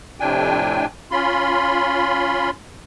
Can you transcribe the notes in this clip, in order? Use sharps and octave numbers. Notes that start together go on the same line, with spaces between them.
F2 A2 C3 D4 G5 G#5
C#4 F4 B5 C6